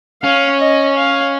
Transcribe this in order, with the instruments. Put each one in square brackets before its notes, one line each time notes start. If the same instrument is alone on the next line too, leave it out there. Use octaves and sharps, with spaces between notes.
[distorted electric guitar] C#4 [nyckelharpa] F5
[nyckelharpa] D#5
F5